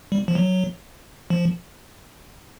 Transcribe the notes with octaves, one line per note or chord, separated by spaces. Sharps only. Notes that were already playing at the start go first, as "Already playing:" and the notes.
G3
F3
F#3
F3